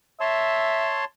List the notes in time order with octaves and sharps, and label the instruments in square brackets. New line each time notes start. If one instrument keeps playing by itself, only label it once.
[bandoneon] C#5 A5 C6 [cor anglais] E5